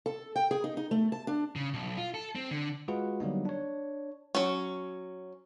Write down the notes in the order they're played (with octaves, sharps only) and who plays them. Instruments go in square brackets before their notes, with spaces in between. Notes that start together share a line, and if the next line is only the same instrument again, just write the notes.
[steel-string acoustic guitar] A4
G5
G#4
D#4
D#4
A3
A5
D4
[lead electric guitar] C#3
B1
F4
A4
C4
D3
[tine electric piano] G#3 F4 F#4 G#4 B4 F#5
D3 F#3 G3 A#3 B3 D#4
D4 C#5
[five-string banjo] F#3 C#4